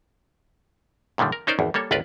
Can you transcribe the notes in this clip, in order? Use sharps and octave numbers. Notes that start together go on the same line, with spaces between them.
F#2 A#2 D3 D#3 G3
A#4
C#4 D#4 A#4 C5 D5
G#1 E2
G3 A#3 A4 C#5
G1 C#2 F4 A#4 B4 D5